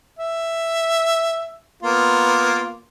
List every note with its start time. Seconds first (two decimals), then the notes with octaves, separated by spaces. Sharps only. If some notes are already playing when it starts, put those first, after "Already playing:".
0.19 E5
1.83 A#3 B3 F4